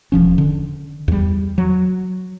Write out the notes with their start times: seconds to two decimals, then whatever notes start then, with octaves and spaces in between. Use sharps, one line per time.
0.12 E1 F3 C#4
0.38 D3
1.08 E2 G3
1.58 F#3